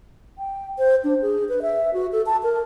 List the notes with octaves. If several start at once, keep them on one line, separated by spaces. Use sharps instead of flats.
G5
C5
D4
G#4
B4
E5
F#4
A4
A5
A#4